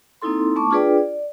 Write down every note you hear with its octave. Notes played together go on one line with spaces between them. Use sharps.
A#3 C4 D#4 E4 A4 C6
A3 B3 A5 C#6 D6
D4 F4 G#4 B4 D5 G5
D5